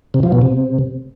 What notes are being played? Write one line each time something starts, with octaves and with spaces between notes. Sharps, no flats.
C3
F3
B2
C3